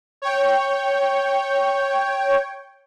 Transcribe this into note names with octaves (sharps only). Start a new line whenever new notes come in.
C#5 G5